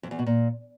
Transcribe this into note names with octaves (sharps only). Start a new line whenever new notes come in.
F2
E2
B2
A#2